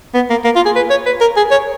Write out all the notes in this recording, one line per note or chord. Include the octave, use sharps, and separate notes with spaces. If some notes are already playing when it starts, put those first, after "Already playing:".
B3
A#3
A#3
F4
G#4
B4
C#5
B4
A#4
G#4
C#5